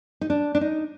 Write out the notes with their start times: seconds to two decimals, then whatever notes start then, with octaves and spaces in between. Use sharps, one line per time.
0.21 D#4
0.30 D4
0.55 D4
0.61 D#4